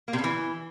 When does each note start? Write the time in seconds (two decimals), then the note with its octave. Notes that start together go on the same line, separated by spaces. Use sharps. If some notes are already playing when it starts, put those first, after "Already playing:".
0.08 A#3
0.13 C3
0.18 C#3
0.24 E3